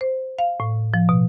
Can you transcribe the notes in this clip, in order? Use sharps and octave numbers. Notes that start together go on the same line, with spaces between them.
C5
F5
A2
F3
B2